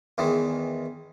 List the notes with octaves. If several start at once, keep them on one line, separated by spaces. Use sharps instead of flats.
E2 D#3 E3 G#3